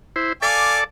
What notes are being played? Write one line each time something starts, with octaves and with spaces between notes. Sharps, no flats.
E4 C5
A4 D5 F5 G#5 A5 D6